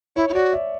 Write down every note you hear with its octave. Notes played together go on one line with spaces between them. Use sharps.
E4 C#5
E4
F#4 D5
E5